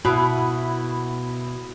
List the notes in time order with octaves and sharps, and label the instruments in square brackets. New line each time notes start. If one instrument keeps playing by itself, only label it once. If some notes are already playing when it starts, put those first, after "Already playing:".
[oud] B2 [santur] E4 B5 D#6 [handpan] F#4